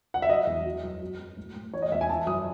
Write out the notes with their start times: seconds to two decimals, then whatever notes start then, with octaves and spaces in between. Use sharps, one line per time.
0.14 F#5
0.22 E5
0.29 F#3 D#5
0.47 E2
0.65 F#3
0.84 F#2
1.02 F#2
1.19 F#2
1.37 A2
1.55 A2
1.73 E3 C#5
1.82 D#5
1.92 E2 E5
2.01 G#5
2.09 E3 A5
2.27 F#2 D#6